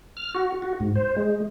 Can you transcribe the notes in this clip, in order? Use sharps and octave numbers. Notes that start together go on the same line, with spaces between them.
F6
F#4
F#4
G#2
C5
G#3